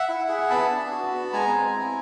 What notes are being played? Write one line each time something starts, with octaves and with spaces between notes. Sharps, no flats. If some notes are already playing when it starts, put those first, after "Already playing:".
Already playing: E5 F#5
E4
G#4
B3 A5 B5
D4
F#4
B3
G#3 G#5 A#5
C4
E4